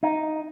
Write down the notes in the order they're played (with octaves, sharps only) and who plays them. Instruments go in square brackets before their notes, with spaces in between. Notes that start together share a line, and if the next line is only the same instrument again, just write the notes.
[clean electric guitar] D#4